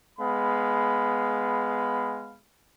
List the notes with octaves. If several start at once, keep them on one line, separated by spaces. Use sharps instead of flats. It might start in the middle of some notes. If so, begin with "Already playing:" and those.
G#3 B3 F5 B5